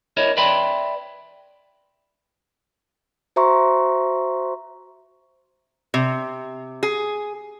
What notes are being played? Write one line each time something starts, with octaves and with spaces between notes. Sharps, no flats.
E4 A#4 C#5 D#5
B4 D5 E5 G5 B5 C6
F#4 C5 E5 A#5 C6 C#6
C3
G#4